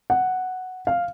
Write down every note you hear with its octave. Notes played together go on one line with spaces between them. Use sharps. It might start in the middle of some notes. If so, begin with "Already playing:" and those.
F#5
F5